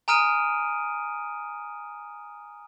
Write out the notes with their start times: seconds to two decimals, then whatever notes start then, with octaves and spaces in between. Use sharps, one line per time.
0.08 G#5 A#5 D#6 F6 D7 D#7